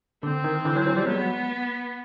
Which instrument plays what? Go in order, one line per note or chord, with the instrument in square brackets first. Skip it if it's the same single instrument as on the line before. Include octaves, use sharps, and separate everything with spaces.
[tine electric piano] D3 [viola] C4
[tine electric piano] D#3
D3 E3
E3 F#3
E3 F#3
F3 G3
[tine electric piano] F#3 G#3 [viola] B3